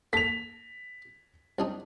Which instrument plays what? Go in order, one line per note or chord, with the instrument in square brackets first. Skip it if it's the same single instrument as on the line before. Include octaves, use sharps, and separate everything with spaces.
[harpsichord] A#3 A4 [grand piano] B6 F7
[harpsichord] C2 D4 D#4